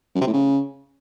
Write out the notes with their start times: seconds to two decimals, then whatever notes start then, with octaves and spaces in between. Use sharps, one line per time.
0.15 F#2
0.21 C3
0.27 A2
0.33 C#3